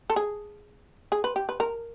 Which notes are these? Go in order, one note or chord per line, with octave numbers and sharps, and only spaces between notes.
A4
G#4
G#4
B4
G4
B4
A#4